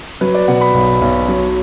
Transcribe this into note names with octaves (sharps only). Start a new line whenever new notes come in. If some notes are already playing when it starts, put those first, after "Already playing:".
F#3 B4
D5
B2 F#5
B5
B1
B1
F#3